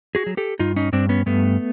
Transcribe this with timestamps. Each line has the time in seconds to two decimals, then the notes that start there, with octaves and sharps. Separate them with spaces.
0.15 F#4 G#4
0.26 F#3
0.37 G4 A4
0.59 G2 D#4 F4
0.76 C#4 D#4
0.93 G2 C4 D4
1.09 B3 C#4
1.26 G2 A3 B3